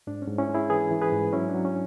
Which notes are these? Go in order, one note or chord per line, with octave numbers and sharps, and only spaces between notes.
G#2 D4
C#4
G#2
C#4 E4
G#3
E4 G#4
E3 G#4 B4
E3
G#4 B4
G#2
F#3 C#4 E4
D4
F#3
C#4